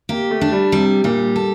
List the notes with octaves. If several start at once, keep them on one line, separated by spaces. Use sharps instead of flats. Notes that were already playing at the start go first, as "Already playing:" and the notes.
A#3 G4
A3
D4
G3
C3 G3
A#2 G3
A4